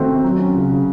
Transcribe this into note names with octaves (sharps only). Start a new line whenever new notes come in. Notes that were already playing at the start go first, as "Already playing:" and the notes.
Already playing: D#3 A3 C4 F#4
C3
F#3
C#4
C#3
C#3